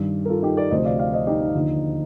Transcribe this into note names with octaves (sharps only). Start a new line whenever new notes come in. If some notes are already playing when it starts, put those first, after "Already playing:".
Already playing: G2 D#3
A#4
F4 A4
D#4 G4
A#4 D5
D2 C3 F3 C5 D#5
D5 F5
D5 F5
C5 D#5
D#4 G4
D#4
D#2 D3 F3